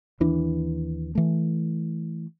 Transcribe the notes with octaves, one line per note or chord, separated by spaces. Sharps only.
D#2 E3 D4
E3 A3